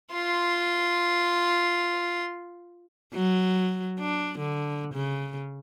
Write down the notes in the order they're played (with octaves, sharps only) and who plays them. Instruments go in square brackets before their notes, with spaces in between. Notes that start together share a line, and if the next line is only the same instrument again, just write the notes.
[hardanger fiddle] F4 C6
[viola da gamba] F#3
D4
D3
C#3